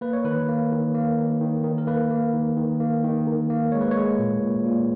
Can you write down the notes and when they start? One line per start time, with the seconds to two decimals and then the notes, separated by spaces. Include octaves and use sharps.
0.01 A#3 B4
0.13 C#5
0.24 D#3 B4
0.49 A#3
0.72 D#3
0.95 A#3
1.18 D#3
1.41 D#3
1.64 D#3
1.78 A#4
1.87 A#3 B4
2.11 A#3
2.33 D#3
2.57 D#3
2.80 A#3
3.04 D#3
3.27 D#3
3.50 A#3
3.72 G#3 C#5
3.81 B4
3.91 G#3 C#5
4.19 A#2
4.42 A#2
4.66 A#2